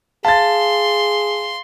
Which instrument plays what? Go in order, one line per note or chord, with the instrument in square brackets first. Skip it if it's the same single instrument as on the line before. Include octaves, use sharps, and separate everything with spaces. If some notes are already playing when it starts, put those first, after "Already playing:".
[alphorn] G#4 [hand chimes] F5 [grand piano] A5 A6 [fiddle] C6